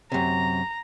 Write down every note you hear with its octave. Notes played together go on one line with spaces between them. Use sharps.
F#2 C3 A#5